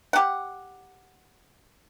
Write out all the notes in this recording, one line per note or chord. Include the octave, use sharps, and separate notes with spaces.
G4 F#5